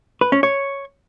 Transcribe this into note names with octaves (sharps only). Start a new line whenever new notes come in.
B4
C#4
C#5